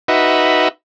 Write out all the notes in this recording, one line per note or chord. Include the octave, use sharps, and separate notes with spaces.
D#4 F#4 B4 E5